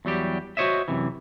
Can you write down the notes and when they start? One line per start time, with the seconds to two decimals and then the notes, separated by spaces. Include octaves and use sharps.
0.05 E2 F#3 G3 G4
0.57 F#4 C5 C#5 D#5 E5
0.88 F#2 C3 E3